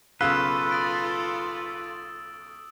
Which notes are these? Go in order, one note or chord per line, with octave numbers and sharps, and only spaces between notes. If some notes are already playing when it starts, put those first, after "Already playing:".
B1 C#3 F4 A4 B4 F5 E6 E7
D#6 A6 D7